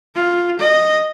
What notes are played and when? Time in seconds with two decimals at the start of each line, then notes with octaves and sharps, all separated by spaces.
0.15 F4
0.59 D#5